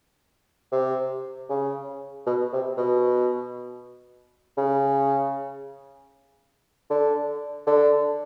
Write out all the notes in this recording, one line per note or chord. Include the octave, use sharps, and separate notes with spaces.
C3
C#3
B2
C3
B2
C#3
D3
D3